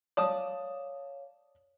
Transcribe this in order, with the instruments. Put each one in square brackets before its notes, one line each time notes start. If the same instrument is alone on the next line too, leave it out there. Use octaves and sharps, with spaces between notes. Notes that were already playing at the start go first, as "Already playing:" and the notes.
[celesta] C#5 F5 [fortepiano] D5 A5 D#6